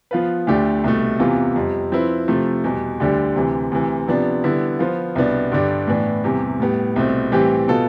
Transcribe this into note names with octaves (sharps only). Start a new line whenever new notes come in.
F3 B3 F4 B4
D2 D3 A3 D4 G4
C2 B2 A3
E2 C3 E3 B3 F4
F2 C3 G3
F3 C4 E4 B4
C3 F3 A3
E2 B2 G3
D2 D3 G3 D4 G4
D2 C3 E3
D2 C3 E3
C3 F3 B3 D4
D3 G3 B3 E4
F3 B3 F4 C5
C2 B2 B3 D4
G2 D3 G3 D4
A2 E3 B3 D4
E2 C3 G3
A2 G3 B3
C2 B2 A3 C4
A2 E3 G3 C4 G4
B2 B3 F4 A4